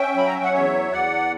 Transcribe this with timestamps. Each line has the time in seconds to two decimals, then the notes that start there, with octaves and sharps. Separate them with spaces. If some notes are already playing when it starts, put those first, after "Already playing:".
Already playing: C#4 E5 G5
0.15 F#3 B5
0.26 A#5
0.36 G5
0.44 F#5
0.53 E2 C#5 E5
0.92 E2 D5 F#5